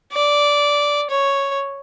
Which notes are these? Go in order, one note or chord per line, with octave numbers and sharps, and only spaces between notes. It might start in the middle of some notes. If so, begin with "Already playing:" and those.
D5
C#5